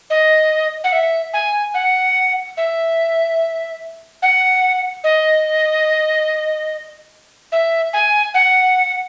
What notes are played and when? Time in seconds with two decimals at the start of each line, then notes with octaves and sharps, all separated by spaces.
0.10 D#5
0.84 F#5
0.93 E5
1.34 G#5
1.74 F#5
2.57 E5
4.22 F#5
5.04 D#5
7.52 E5
7.93 G#5
8.34 F#5